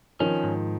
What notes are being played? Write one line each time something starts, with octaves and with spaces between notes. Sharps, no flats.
D#3 F3 C#4
G#2